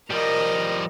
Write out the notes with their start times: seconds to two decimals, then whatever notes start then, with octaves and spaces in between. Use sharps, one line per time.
0.10 F3 G3 A#4 D#5